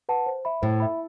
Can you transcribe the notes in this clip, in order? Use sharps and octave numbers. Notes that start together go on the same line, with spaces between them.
B4 F#5 A5
C5
E5 B5
A2 C5
E5 B5